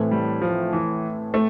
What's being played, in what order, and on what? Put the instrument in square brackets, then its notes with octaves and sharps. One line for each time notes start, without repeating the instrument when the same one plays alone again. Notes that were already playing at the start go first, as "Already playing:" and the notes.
Already playing: [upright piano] A2 E3 A3 C4 E4
[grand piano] G3
F3
E3
A3